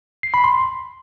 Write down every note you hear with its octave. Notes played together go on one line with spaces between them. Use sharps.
C7
B5
C6